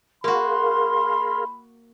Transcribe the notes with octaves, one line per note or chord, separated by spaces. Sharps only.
A#3 F#4 G#4 A#4 F5 B5 C6